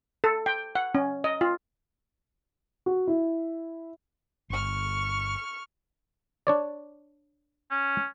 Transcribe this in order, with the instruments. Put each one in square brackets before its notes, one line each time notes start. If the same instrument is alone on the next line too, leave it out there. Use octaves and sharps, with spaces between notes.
[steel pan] A4
G5
F#5
C#4
D#5
F4
[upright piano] F#4
E4
[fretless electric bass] G1 [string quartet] C#6 F6
[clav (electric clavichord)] D4 C#5 D5
[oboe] C#4